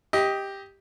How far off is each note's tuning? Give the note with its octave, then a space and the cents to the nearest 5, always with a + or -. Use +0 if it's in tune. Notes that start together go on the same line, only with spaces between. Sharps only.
G4 +5 D#5 +15